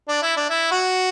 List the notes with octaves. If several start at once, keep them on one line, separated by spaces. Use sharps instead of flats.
D4
E4
D4
E4
F#4